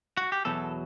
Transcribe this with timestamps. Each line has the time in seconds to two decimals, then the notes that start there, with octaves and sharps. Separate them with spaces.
0.17 F#4
0.32 G4
0.45 E2 B2 F#3 A4